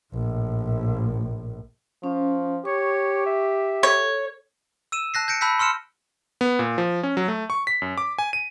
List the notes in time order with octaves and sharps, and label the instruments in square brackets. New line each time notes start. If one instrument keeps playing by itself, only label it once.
[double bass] A#1 A2
[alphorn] F3 [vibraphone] C#4
[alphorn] G4 [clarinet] C#5 [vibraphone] C#6
[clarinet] E5
[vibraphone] A4 [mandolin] C#5
[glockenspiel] E6 D#7 E7
A5 F#6 A#6 C7
G6 A#6 C#7 D7
A5 B5 E6 F#6 G6 B6
C6 E6 F6 C#7 E7
[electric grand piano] B3
A#2
F3
C#4
F#3
A3
C#6
B6
F#2
D6
G#5
D#7